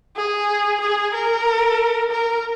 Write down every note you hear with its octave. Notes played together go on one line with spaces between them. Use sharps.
G#4
G#4
A#4
A#4